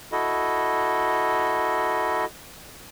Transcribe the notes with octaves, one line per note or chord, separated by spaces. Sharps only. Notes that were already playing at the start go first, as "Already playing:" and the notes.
E4 F#4 A4 D#5